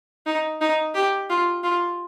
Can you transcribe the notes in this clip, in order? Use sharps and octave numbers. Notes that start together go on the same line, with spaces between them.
D#4
D#4
G4
F4
F4